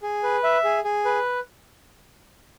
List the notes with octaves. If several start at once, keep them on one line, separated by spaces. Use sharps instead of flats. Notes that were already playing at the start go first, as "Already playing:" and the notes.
G#4
B4
E5
G#4
G#4
B4